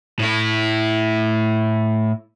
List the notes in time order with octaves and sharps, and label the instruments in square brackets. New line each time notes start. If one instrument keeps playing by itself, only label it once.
[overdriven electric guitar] A2 E4